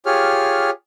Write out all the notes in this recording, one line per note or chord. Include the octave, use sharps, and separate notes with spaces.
F4 G4 G#4 C#5 F6